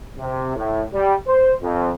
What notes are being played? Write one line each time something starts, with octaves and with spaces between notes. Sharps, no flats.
C3
A2
G3
C5
F2